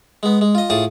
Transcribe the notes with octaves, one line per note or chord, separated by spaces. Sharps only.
G#3 B3
G#3
F4 D#5
A2 F4 G#4 A5 D#6